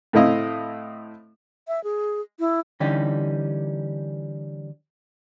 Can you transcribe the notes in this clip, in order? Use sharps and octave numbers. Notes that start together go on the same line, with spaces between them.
A2 A3 C4 E4 D#5 F5
E5
G#4
E4
D3 E3 G3 C#4 D#4 G4